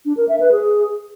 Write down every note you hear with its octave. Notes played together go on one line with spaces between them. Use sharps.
D4
A#4
E5
B4
G#4